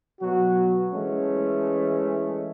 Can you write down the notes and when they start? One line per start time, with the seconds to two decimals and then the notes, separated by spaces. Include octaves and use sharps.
0.21 B2 F#3 F#4
0.93 E3 G#3 A3 C#4